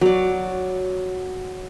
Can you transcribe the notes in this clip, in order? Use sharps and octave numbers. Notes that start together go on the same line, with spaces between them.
F#3 D5